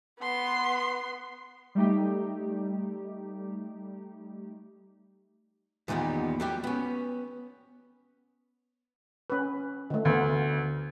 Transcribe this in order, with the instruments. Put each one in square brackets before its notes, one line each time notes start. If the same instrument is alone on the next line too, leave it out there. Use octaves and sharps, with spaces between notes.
[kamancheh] B3 C6
[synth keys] G3 A3 D#4 G4
[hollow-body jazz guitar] E2 A#2 D#3 G3 B3
F#3 G3 G4
B3 C#4
[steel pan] C#4 B4
D3 A3
[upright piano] D2 [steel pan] B3